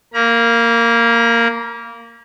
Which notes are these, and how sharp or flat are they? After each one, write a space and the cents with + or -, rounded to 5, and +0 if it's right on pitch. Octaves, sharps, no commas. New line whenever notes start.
A#3 -10 A#5 +40